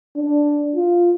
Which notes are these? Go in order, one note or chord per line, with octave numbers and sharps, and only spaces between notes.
D4
F4